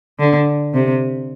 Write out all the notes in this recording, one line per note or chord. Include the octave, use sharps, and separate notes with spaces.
D3
C3